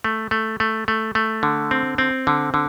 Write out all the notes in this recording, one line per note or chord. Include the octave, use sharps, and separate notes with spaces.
A3
A3
A3
A3
A3
D3
C4
C4
D3
D3